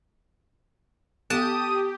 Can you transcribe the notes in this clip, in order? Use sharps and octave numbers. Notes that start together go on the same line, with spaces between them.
B3 G4 A4 A5 D#6